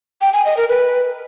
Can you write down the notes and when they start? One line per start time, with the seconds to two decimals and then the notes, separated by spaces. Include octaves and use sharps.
0.21 G5
0.33 G#5
0.45 D#5
0.57 A#4
0.69 B4